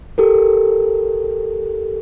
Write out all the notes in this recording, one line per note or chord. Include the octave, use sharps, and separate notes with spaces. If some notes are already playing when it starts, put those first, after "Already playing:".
G4 A4 A#4